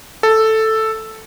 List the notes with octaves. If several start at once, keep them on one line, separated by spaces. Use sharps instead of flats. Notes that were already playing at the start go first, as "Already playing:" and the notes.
A4